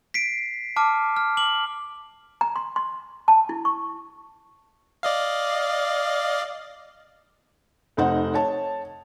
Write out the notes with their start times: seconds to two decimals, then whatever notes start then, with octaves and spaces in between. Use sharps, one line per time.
0.14 B6 C7 D7
0.76 A5 D6 F6
1.17 F6
1.37 D6 F#7
2.41 A#5
2.56 C6
2.76 C6
3.28 A5
3.49 E4
3.65 C#6
5.03 D5 D#5 F5
7.97 F1 D#4 C5 F#5
8.34 C#5 A5